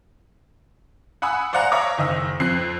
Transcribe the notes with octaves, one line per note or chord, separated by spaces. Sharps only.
F#5 G#5 B5 D#6 E6 F#6
C5 D5 F5 F#5 G#5 A#5
C#5 E5 F5 A#5 D6
F#1 D#3 D#5 E6
F2 C4 F#6 C7